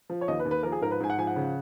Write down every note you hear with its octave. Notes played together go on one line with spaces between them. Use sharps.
F3
C#5
D#2 D#5
B4
D#2
B4
F3 A#4
G#4
G#2 A#4
B4
G#2 G#5
F#5
F3 G#5
F#5
C#3